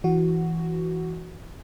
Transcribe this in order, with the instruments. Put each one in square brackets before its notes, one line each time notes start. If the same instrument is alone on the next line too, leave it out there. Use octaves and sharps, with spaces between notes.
[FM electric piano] E3 F#4